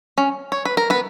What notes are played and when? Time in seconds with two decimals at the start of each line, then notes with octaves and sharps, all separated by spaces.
0.18 C#4
0.52 C#5
0.65 B4
0.77 A#4
0.90 B3 B4